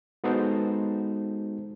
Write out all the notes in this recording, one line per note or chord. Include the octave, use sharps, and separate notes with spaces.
G#3 B3 D#4 F#4 A4 C5